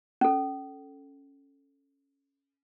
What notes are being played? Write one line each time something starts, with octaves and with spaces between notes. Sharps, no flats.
C#4 A4